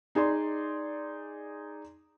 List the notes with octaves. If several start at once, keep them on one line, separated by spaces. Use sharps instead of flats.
D#4 G#4 D5 C6